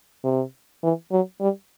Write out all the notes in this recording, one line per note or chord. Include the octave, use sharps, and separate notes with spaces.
C3
E3
F#3
G3